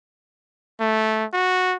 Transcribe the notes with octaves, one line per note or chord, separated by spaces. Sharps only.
A3
F#4